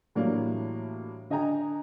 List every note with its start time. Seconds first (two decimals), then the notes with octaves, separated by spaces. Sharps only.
0.15 A2 E3 F#3 G3 A#3 D4
1.30 D3 D#5 G5 G#5 A#5